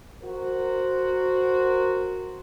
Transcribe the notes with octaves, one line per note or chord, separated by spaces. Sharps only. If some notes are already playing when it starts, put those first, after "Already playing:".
F#4 A#4 C5